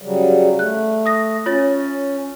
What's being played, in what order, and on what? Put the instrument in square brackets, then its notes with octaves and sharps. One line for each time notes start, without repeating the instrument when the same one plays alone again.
[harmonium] C#3 F#3 G3
[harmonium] A3 [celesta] F#6
[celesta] D#6 A#6
[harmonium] C#4 [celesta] F4 C#5 A6